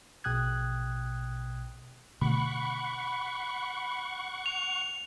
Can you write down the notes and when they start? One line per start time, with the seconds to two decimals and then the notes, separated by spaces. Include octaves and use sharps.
0.24 A#1 B2 G5 D#6 F#6 G#6
2.21 B2 D3 A3 F#5 B5 C#6
4.46 F7